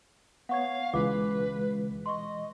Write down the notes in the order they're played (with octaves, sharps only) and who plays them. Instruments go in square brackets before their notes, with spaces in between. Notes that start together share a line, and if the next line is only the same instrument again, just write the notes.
[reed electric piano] B3 C#5 [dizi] F5 [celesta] F#5 C#6 G#6
[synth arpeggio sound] C#2 [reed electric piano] B2 E3 G#3 [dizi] B4 [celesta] D6
[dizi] D#5 [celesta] C6 C#6